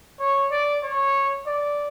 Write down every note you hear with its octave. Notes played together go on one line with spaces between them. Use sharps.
C#5
D5
C#5
D5